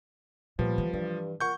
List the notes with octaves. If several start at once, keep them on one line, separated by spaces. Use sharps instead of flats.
A#2 F3 G3 B3
E3
G2 E3
A#2 F#5 C#6 G6